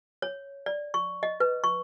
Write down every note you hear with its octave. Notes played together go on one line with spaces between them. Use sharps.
C#5
D5
C#6
D#5
B4
C#6